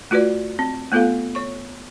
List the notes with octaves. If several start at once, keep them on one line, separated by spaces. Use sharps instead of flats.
A3 F4 F#4 B4 D5
C4
A3 B3 F4 A4 F5
C#5 C#6